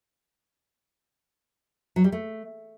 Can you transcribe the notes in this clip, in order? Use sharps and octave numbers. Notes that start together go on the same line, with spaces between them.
F#3
G3
A3